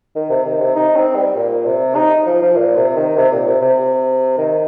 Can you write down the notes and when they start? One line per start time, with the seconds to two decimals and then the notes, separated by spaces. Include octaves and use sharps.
0.15 D#3
0.30 C3
0.45 D#3
0.60 C3
0.76 D#4
0.96 C4
1.16 G3
1.36 A#2
1.65 C3
1.96 D#4
2.26 F3
2.42 F3
2.56 A#2
2.76 C3
2.97 D#3
3.17 C3
3.32 A#2
3.47 C3
3.62 C3
4.37 D#3